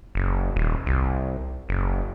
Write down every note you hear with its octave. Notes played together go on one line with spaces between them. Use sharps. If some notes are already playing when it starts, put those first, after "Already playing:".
F#1
D#1
C2
F#1